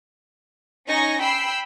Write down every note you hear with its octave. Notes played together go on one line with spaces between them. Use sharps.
C#4 D#4 G#5 C#6 A#6
G5 B5 E6 C7